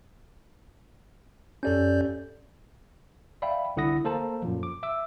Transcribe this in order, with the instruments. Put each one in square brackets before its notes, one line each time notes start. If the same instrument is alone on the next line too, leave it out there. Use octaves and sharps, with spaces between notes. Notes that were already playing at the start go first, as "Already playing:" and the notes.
[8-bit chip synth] F#2 D5 G6 [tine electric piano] C#4 G4 A4
[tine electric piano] D5 E5 F5 G5 B5
C2 D3 E4 F#5 D#6 A#6
A#3 A4 C5 A5 A#5
F#2 A#2 F3
D6
E5 D6 E6